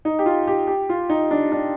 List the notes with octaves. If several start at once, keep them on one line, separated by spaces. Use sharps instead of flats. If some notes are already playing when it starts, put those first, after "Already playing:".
D#4
G4
F4
G4
G4
F4
D#4
D4
D4